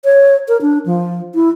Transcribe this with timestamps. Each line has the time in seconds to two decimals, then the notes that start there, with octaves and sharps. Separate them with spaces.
0.05 C#5
0.48 A#4
0.61 D4
0.86 F3
1.35 E4